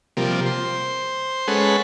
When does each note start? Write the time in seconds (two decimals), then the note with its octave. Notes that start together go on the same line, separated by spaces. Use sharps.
0.17 C3 F3 G3 A#3
0.46 C5
1.48 G#3 C#4 A4 B4 F#5